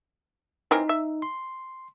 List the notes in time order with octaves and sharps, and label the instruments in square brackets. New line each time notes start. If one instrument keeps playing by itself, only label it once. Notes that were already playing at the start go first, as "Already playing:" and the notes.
[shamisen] E3 C4 A#4 [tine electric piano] D#4
[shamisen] E5
[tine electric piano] C6